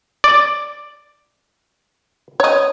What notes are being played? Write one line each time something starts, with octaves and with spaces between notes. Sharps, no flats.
D5
C#5 D#5